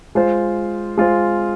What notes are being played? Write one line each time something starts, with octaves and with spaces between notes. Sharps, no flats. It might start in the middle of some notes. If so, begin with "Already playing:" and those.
G#3 F4 C5
G#3 F4 C5